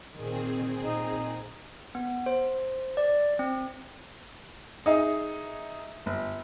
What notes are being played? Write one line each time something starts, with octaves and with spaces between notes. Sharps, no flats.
A#2 D#3 C4 G#4
A#2 D#4
B3
C5
D5
C4
D#4 G#4 D#5 E5
G1